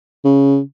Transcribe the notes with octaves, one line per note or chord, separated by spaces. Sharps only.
C#3